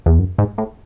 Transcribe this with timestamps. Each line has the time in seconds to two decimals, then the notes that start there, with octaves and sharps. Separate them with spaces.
0.06 E2
0.19 F#2
0.38 G#2
0.58 A2